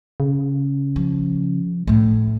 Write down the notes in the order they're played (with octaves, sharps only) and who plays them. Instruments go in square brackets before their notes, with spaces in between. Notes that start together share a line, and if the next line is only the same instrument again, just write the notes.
[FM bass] C#3
[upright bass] F3
A2 A3